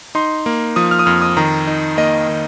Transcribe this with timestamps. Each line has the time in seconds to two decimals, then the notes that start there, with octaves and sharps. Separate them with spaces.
0.15 D#4 C6
0.46 A#3
0.76 F3 D#6
0.91 F6
0.99 D#6
1.06 F2 F6
1.22 D#6
1.37 D#3 A#5
1.67 D#4
1.97 A#3 D#5
2.28 D#3